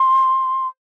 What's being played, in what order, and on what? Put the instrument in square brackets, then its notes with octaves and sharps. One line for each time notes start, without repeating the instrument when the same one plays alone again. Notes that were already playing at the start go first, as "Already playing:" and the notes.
Already playing: [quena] C6